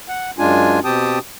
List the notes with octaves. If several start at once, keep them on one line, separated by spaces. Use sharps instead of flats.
F#5
F#2 G#3 D4 F4 G#5
B2 C4 G4 G5 A5 D#6